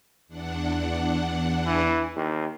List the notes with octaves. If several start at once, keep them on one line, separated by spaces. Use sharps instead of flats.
E2 D4 F#5
E3
D#2